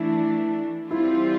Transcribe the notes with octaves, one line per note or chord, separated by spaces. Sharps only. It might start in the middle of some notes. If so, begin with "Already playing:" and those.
Already playing: E3 A3 D4 E4
E3 G3 C4 E4 F4